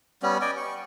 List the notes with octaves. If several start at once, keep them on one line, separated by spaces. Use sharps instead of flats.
G3 B3 C#4
D5 D#5 G5 G#5
C#6